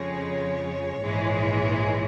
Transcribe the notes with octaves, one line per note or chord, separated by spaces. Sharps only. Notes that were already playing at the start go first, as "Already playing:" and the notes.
Already playing: F2 C#3 F3 G#3 C#5
A#1 G#2 E3 G#3